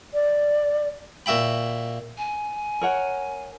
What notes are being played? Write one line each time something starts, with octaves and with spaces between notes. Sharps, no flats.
D5
A#2 F#4 E5 G5 B5
G#5
A#4 C#5 F#5